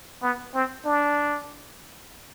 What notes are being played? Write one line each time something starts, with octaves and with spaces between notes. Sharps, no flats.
B3
C4
D4